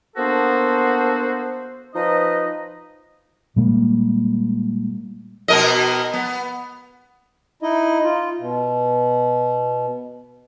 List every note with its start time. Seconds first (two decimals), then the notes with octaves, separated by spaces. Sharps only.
0.17 A#3 B3 D4 F#4 A4 C5
1.95 F3 D#4 B4 D#5
3.56 A#2 G3 G#3 A#3
5.48 B2 A#4 D#5
6.14 B3
7.62 D#4 E4 D#5
8.03 F4
8.40 B2